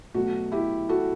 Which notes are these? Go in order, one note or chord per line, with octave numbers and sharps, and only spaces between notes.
B2 F#3 A3 F#4
E4 G4
F#4 A4